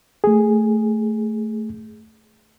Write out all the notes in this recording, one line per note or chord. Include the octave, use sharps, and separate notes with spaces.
A3 G#4